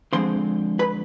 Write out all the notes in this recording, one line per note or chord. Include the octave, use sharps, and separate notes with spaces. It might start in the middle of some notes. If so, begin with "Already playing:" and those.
D3 F3 G#3 C4 C5 C6
B4 B5